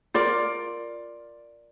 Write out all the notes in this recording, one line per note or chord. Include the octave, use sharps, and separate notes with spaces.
F4 A#4 D5